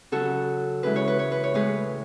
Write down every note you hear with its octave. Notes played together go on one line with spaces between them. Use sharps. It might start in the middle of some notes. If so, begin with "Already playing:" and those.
C#3 F#3 F#4 A4
C#3 E3 G#3 B4
C#5
B4
C#5
B4
C#5
A2 G#3 G#4 B4